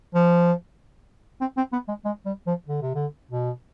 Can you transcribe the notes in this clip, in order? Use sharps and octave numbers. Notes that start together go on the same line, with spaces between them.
F3
C4
C4
B3
G#3
G#3
G3
F3
D3
C3
D3
B2